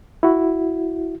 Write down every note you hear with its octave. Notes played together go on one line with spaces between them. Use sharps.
E4 F#4